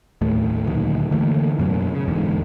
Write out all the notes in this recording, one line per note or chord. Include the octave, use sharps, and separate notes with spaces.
D#2 A2 A3
D2 A#2 D#3 F#3
D3 E3 A3 A#3
F#2 B2 F#3 A#3
C#3
E1 E2 G#2 D3